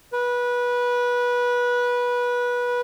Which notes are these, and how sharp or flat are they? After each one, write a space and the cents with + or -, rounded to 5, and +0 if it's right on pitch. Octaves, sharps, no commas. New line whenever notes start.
B4 -20